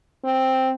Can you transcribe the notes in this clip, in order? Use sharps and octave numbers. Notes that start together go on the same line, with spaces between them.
C4